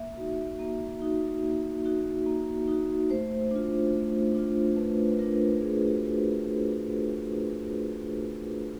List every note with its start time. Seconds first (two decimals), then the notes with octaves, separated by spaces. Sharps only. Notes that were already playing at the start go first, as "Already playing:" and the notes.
Already playing: A#3 E5
0.17 D#4 F#4
0.59 A#3
1.02 D#4 F#4
1.43 A#3
1.85 D#4 F#4
2.26 A#3
2.68 D#4 F#4
3.10 A3 C5
3.51 D4 F4
3.93 A3
4.35 D4 F4
4.76 A3 B4
5.08 B4
5.19 D4 F4 A#4
5.60 A3 G#4
5.88 F#4